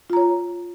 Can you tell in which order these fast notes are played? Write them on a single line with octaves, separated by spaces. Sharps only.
F4 A#5 C#5